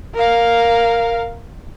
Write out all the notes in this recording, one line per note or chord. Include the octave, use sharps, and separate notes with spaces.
A#4 F5